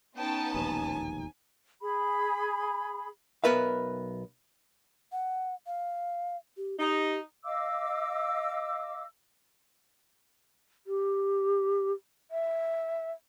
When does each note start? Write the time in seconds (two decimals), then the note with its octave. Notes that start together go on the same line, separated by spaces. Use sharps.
0.18 B3 C#4 D#4 G5 A5
0.54 E1 A#1 D#2 G#5
1.82 G#4 B5
3.44 B1 B3 A#4 B4 E5 F5
5.12 F#5
5.67 F5
6.57 G4
6.79 D#4 G4
7.45 D#5 F5 D6 E6
10.87 G4
12.31 E5